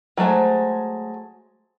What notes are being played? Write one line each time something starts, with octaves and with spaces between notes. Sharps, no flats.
F#3 G#3 A3 C5